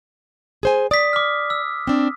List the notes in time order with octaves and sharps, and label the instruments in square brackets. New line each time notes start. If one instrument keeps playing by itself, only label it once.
[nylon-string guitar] G#4 C5 G#5
[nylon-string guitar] D5 [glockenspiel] D#6 B6
[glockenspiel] D6 F6
E6
[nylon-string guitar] C4 D4